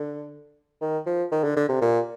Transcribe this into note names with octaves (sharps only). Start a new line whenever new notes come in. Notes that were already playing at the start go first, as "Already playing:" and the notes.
Already playing: D3
D#3
F3
D#3
D3
D3
C3
A#2